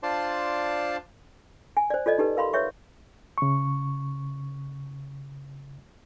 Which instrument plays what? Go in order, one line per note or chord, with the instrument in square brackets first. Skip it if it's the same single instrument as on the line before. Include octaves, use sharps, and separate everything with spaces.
[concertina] D4 F4 C5 D5 A5 C6
[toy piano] G#5
C5 D5
F4 A4 D5 D#5
D#4 G4 A4 B4
A#4 F5 B5 C6
B4 C#5 E5 C#6
[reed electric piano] C#3 C#6